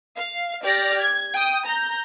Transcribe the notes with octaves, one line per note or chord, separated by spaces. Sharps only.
F5
G4 D5 F6 A#6
G#6
G5 D#6
A#5 G6